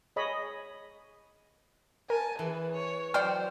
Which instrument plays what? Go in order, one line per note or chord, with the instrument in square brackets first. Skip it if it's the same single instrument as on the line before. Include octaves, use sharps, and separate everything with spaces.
[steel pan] G#4 C#5 D#5 B5
[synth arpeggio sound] A#4 [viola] G#5 A5
[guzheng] E3 [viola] G#4 B4
[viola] C#5
[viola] F#3 [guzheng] C5 [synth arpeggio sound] D5 G5 [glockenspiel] F6